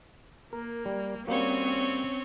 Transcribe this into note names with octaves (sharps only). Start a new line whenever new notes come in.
A#3 A#4
G3
G3 A#3 C4 C#4 F#4 C#5